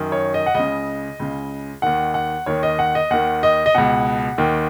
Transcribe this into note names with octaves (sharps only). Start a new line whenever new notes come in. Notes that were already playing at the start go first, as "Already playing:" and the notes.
Already playing: F#2 D#3
C#5
D#5
F#5
C#2 C#3 D#5
C#2 C#3
D#2 D#3 F#5
F#5
D#2 D#3 C#5
D#5
F#5
D#5
D#2 D#3 F#5
D#5
D#5
C#2 B2 F#5
D#2 D#3